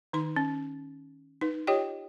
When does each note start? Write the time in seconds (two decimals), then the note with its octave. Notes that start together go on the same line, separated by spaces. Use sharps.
0.13 D#3 D#4 C6
0.36 C#4
1.41 D#4 B4
1.67 F4 G4 C#5 D#5 G5